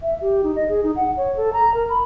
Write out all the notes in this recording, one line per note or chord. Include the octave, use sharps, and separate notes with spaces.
E5
G4
D#4
D#5
G#4
D#4
F#5
C#5
A4
A#5
A#4
B5